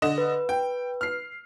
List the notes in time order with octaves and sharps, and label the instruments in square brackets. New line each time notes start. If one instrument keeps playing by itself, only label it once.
[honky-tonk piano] D3 D#5 E7
[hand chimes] B4
[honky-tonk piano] G5
F6 C7